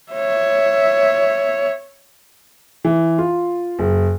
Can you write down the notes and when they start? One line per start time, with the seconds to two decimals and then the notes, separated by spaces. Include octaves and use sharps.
0.13 C#5 E5
2.85 E3
3.18 F4
3.79 F#1